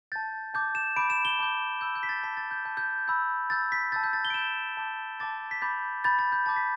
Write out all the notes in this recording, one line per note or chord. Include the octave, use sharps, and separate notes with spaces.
A5 G6 A6
A5 D6 G6
E7
B5 D6 G6 D7
E7
G7
A5 D6 G6
B5 E6 G6
G6
B6
A6
A5 E6 G6 B6
A6
G6
A5 G6
G6
B5 E6 G6
B5 E6 G6 A6
B6
A5 E6 G6 A6
G6
A6
G7
D7
B5 G6 E7
A5 D6 G6
A5 D6 G6 A6
B6
B5 D6 G6 A6
B5 G6 A6
A6
G6
A5 D6 G6 A6
B6